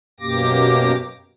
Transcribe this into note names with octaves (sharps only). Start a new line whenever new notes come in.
F#2 B2 A#3 G4 D6 A#6